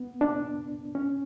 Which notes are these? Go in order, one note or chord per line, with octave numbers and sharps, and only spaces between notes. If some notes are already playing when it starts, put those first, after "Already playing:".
Already playing: B3
D4
C#4